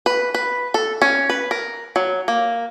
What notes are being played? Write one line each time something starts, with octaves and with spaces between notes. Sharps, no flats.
B4
B4
A4
C#4
B4
A#4
F#3
A#3